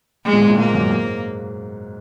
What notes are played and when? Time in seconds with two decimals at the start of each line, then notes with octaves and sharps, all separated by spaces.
0.25 G#3
0.33 A#2
0.42 G#2
0.49 A#2
0.57 G#2 A#3
0.74 F#2
0.91 G#2